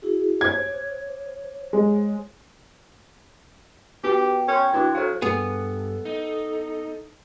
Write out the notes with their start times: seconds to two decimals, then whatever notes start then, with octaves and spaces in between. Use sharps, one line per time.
0.02 E4 F#4 G#4
0.41 C5 C#5 G#6
1.73 G#3
4.04 B3 F#4 G4 B4 G5
4.48 C#4 A#4 G5 C6 G6
4.74 E3 D4 E4 F#4 F#6 G#6
4.95 F#3 A4 C5 F5
5.22 G2 B3 G#4 A4
6.05 D#4